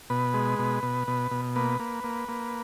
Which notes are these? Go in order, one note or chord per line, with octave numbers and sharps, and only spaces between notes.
B2 B4
G#3
B2
B2
B2
B2
A#3 B4
A#3
A#3
A#3